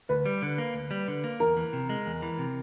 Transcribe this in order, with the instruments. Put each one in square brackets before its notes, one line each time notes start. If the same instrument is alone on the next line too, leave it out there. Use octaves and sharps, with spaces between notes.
[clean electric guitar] D2 [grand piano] B4
[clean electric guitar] G3
D3
A#3
D2
G3
D3
A#3
[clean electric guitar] E2 [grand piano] A#4
[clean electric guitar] E3
C3
G#3
E2
E3
C3